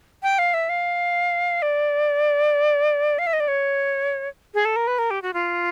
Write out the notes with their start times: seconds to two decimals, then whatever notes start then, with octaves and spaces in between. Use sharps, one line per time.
0.23 G5
0.39 F5
0.54 E5
0.69 F5
1.62 D5
3.19 F5
3.27 E5
3.33 D#5
3.40 D5
3.48 C#5
4.54 G#4
4.65 A4
4.76 A#4
4.87 B4
4.99 A#4
5.11 G4
5.22 F#4
5.34 F4